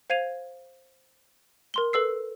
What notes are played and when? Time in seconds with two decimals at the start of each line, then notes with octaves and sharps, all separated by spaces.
0.10 C5 F5 G#6 D#7 F7
1.74 A#4 C6 G7
1.93 A4 B4 E6 C7